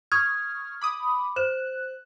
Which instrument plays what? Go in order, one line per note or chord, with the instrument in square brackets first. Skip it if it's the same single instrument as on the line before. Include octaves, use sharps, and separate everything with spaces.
[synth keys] C#6 D#6 F6 [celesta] G#6
[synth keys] B5 D6 D#6
[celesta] C5 E7 [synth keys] F#6